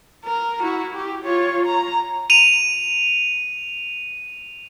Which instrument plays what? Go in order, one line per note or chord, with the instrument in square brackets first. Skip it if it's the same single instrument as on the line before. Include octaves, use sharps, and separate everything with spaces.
[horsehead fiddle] A#4
E4 F#4
G4
F4 C#5
A#5
[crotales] D#7 F7